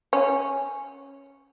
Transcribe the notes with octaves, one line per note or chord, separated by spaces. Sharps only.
C#4